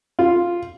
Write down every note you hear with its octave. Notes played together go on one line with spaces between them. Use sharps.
F4